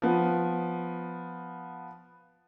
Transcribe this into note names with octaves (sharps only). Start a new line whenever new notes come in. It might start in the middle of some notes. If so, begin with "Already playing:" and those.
F3 B3